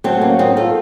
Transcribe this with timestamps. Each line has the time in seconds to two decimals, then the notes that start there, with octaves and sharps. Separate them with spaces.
0.04 F#3 A3 C4
0.21 A#3 C#4
0.39 D#3 C4 D#4
0.57 F4 A4